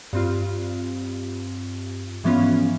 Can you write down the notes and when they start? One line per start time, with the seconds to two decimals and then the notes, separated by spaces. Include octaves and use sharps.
0.13 G2 C4 F4
2.24 G#2 E3 F3 B3 C#4 F4